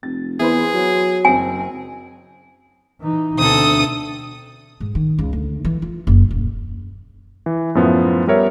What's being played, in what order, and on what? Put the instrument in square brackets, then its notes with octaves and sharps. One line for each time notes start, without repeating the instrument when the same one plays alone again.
[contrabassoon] F1 [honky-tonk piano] A6
[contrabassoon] E2 [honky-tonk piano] E4 B4 C5 [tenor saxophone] G#4
[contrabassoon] F#3
[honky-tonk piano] F#1 C4 [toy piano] G#5
[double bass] E3 D#4
[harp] D2 C4 [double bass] B2 [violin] A4 D#6
[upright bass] G#2
D#3
C#2
D2
E3
F4
F#1
D#1
[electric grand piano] E3
F#2 A2 F3 B3 E4
G3 B3 A#4 C#5 E5